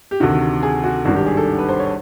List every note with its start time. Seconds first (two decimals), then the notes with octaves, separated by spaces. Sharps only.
0.11 G4
0.20 D2 C3 D#3 F#4
0.63 G#4
0.84 F#4
1.05 G#1 G2 D#3 F#4
1.16 G4
1.26 G#4
1.37 A4
1.58 B4
1.69 C5
1.79 C#5